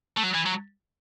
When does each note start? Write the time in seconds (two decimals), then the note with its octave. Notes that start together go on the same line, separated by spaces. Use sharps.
0.17 A3
0.23 F#3
0.34 E3
0.46 F#3